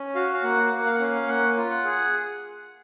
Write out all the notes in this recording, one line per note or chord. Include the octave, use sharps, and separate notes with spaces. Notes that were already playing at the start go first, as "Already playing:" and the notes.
Already playing: C#4
F#4 F5
F5
A#3 F#5
A#3
F5
F#5
C#4 F5
A#3 F#5
F4
F#5
G#4
F#5